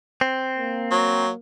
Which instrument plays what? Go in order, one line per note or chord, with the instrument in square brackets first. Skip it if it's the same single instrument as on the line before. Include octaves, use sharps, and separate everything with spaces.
[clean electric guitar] C4
[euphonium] A#3
[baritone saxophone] F#3